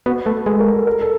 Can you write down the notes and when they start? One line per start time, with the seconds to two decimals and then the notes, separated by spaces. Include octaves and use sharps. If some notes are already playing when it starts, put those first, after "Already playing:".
0.06 B3 F#4
0.26 A3 B4
0.46 G#3 A4
0.60 A#4
0.74 A4
0.87 A#4
1.01 A4